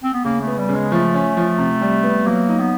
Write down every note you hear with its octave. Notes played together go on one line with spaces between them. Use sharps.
C4
B3
C#3 A#3
A3
B3
G3
C#3
G#3
F3 A3
C#4
F3
C3
G3
B3
F#3 A#3
D#4
B3